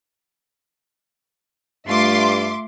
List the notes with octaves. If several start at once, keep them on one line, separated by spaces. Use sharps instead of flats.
G2 A3 F4 E5 C6 D6